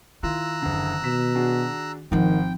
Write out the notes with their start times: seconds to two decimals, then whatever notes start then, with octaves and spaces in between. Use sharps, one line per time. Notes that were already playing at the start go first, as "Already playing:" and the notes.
0.23 D#3 E4 F4 A#5 E6 F#6
0.62 F#1 D3
1.04 B2 B6 E7
1.35 D4 F#4 G#4
2.12 G#1 D#3 F3 C4 F#5 G5